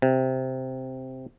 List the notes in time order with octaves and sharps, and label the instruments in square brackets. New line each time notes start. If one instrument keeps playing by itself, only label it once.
[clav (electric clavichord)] C3